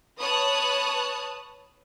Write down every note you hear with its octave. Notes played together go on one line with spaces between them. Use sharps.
B4 C#5 A5 D#6 F#6